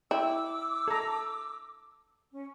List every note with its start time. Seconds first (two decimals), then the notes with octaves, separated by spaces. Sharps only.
0.11 E4 G5 D6 E6
0.88 A4 A#5
2.32 C#4